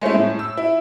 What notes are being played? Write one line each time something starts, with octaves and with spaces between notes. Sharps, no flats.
G#3 A3 C#4 E4
A2
E6
E4